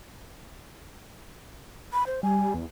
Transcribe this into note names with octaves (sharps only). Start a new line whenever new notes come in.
B5
C5
G3 G#5
E2